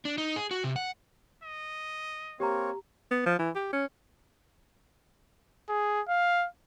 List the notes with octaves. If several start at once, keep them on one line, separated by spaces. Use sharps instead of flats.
D4
D#4
G#4
F#4
C3
F#5
D#5
A#3 C4 G4 C#5 A#5
B3
F3
E3
G4
C#4
G#4
F5